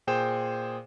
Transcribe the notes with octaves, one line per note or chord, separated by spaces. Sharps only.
A#2 G#4 C5 G5 E7